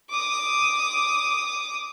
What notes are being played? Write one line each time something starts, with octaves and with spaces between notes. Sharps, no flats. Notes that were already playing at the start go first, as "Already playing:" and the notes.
D6 D#6